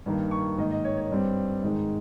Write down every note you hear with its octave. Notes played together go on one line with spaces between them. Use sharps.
G2 D#3 A#3
C#6
G#2 D#3 A#3 D#5
D#5
C#5
C#5
G2 G3 C4
G#2 D#3 G#3 D#5